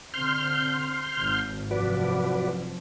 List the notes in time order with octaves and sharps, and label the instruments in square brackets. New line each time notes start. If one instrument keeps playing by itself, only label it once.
[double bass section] D3 C4 [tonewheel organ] C6 F6 G6
[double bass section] G#1
[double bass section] F1 F#2 F3 [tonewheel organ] F#4 B4 D5